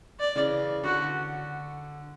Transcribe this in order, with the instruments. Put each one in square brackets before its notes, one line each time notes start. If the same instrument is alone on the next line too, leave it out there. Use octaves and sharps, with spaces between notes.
[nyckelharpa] D5
[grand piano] C#3 E3
[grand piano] D3 [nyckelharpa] F#4